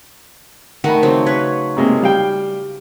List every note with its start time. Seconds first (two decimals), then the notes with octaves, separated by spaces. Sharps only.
0.84 D#3 A3 D#4 F#5 B5
1.03 C#3 F#3 C4
1.26 B4 C#5
1.77 C3 G#3 A#3
2.02 G3 F5 G5